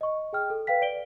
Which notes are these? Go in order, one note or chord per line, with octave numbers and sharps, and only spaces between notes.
D#5 C#6
G#4 G5 F6
A4
B4 F5 G5 B6
D5 D7 G7